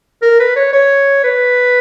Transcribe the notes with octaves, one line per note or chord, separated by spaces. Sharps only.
A#4
B4
C#5
C#5
B4